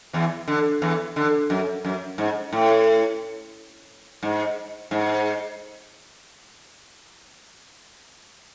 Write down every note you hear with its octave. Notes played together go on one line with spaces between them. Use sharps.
E2 E3
D3
E2 E3
D3
F#2
F#2
G#2
A2
G#2
G#2